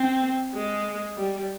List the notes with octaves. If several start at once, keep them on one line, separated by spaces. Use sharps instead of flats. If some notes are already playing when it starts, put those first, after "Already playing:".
Already playing: C4
G#3
G3